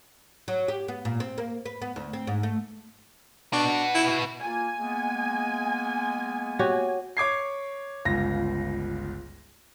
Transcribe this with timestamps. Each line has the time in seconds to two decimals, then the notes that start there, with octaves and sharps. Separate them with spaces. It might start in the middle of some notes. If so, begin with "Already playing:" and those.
0.48 F#3
0.68 G4
0.88 B3
1.05 A#2
1.20 C4
1.38 A#3
1.65 B4
1.82 B3
1.96 D2
2.13 C4
2.27 G#2
2.43 A3
3.53 B3 D4 F#4
3.95 E4
4.43 A#3 F4 G#5
4.80 G#3 A#3 B3
6.59 F#4 G4 C#5
7.17 C#5 D6 G#6 C7
8.05 G1 C#2 F4 A#6